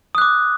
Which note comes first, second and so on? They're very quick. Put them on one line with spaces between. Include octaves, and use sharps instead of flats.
D#6 F#6 D6